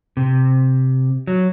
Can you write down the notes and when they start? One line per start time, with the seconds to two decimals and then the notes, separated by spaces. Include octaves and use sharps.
0.17 C3
1.27 F#3